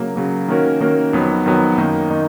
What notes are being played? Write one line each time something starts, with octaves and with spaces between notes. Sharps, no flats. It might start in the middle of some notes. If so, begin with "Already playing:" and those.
Already playing: C#3 F#3 A#3
C#3 F#3 A#3
D#3 A#3 C#4 F#4 A#4
D#3 A#3 C#4 F#4 A#4
F2 D#3 F#3 B3
F2 D#3 F#3 B3
F#2 D#3 A#3 D#4
D#3 A#3 D#4